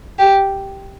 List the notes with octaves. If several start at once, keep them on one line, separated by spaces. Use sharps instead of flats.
G4